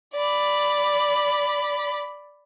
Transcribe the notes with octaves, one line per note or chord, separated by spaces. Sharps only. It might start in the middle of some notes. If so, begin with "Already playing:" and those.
D5 B5